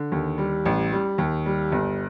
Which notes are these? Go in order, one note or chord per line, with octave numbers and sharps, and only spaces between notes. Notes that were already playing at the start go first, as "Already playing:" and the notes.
Already playing: D3
D#2
G3
A1
G3
D#2
G3
G1